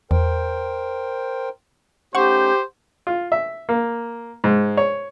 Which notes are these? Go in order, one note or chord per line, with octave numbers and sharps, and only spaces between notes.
E2 A#4 C5 G5
A3 C#4 D#4 G4 C5 F#5 C#6
F4
E5
A#3
G#2
C#5